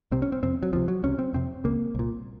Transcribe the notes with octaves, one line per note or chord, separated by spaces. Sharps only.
C2 C3 C4
C#4
C4
F2 C3 C4
F#3
C#2 C3 F3
F#3
C#2 C3 C#4
C4
F2 C3 C4
C#2 C#3 A#3
C2 A#2